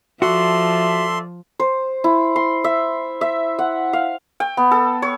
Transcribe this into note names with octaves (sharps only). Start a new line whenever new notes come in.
F3 F#4 A4 D5 E5 C6
C5
E4
C6
E5
E5
F#5
F5
G5
B3
A4
C#5